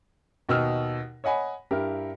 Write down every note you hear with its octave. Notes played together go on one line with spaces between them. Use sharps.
D#2 B2 D#4 D#5 E6 F6
C#5 D#5 F#5 G#5 B5
G2 E4 G4 A#4